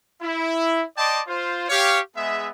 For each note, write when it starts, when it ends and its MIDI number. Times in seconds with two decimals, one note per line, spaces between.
0.21 0.83 64
0.97 1.20 74
0.97 1.20 75
0.97 1.20 79
0.97 1.20 81
0.97 1.20 84
0.97 1.20 86
1.27 1.66 65
1.27 1.66 72
1.69 1.99 67
1.69 1.99 73
1.69 1.99 77
2.16 2.49 56
2.16 2.49 59
2.16 2.49 68
2.16 2.49 76